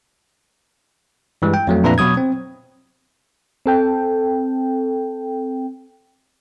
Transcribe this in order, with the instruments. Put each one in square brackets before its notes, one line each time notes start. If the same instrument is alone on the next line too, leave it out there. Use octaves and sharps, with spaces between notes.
[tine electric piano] G2 E3 G3 G#3
G5
F2 F#3 A3
F2 A#2 D4 B4 E5 A#5
B2 F#3 D#6 G#6
C4
[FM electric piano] C4 A4 G5